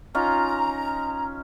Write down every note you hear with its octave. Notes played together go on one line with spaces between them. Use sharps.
C#4 D#4 F4 A#5